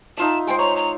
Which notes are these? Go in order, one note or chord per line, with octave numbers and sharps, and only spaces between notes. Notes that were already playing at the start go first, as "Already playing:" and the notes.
D#4 F4 E5 A5
G#3 C5 G5
C#5 A#5
A#5